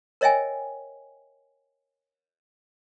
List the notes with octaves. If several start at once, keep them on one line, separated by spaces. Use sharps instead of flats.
A#4 C#5 D#5 E5 G5 G#5